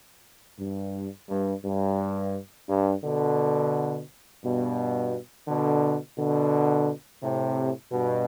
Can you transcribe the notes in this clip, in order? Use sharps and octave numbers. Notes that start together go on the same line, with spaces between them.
G2
G2
G2
G2
B2 D3
G2 B2
B2 D3
B2 D3
A2 C3
G2 B2